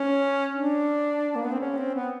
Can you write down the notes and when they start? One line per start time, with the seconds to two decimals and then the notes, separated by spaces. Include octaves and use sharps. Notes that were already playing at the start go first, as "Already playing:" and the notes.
Already playing: C#4
0.56 D4
1.36 A#3
1.44 B3
1.52 C4
1.60 C#4
1.78 C4
1.95 B3